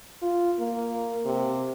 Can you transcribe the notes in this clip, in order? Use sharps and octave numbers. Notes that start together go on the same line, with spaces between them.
F4
A#3
C3